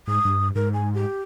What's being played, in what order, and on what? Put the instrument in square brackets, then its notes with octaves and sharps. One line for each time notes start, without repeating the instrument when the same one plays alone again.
[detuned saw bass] G#2 [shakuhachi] D#6
[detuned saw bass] G2
[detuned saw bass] G#2 [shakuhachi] A#4
[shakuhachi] G#5
G4